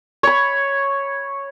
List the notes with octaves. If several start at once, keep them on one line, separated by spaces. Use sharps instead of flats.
C#5 B5